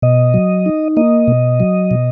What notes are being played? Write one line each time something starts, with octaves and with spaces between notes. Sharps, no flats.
B2 D#5
F#3
D#4
A#3 D#5
B2
F#3
B2